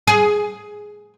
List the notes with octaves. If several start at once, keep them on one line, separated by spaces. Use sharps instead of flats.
G#4